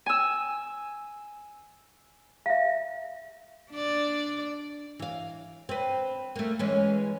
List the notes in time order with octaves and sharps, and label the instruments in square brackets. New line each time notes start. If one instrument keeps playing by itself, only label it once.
[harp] G#5 E6
[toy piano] E5 F5
[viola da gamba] D4 D5
[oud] E3 F5
C4 B4
A3 A#3
E3 G#3 C#4